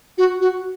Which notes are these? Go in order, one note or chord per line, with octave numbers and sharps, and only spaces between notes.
F#4
F#4